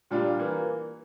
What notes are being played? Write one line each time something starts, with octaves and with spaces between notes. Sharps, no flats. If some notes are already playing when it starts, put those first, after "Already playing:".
A#2 G3 D4 F4
E3 A#3